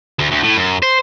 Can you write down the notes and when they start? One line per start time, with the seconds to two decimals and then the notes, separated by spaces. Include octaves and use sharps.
0.19 D2
0.31 D2
0.43 A2
0.57 F#2
0.83 C5